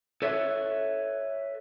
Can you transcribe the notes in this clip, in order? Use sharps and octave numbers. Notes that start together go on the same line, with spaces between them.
A4 B4 C#5 E5